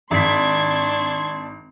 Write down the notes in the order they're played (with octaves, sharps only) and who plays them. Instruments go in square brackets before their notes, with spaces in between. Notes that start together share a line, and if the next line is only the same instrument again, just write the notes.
[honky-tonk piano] G#1 B6 [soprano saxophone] D4 [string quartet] C6 C#6 G#6